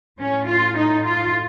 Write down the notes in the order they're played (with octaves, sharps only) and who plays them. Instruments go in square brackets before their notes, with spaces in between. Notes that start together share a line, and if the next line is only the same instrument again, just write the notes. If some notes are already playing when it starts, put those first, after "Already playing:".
[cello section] A2 C#4
F4
D#4
F4